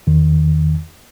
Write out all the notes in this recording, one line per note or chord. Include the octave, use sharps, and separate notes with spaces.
E2 D#3